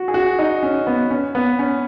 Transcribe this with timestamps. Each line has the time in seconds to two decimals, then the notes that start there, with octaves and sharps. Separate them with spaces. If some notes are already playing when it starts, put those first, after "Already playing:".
Already playing: F#4
0.08 G#4
0.14 F#4
0.39 D#4
0.63 C#4
0.87 B3
1.11 C#4
1.35 B3
1.59 C#4